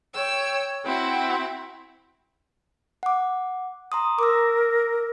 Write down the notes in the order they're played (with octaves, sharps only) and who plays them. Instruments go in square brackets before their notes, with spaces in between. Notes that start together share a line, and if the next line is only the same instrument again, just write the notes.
[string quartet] C#5 G5 E6
C4 E4 F#4
[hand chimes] F#5 D6
A#5 C6 D#6
[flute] A#4 [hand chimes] D6 E6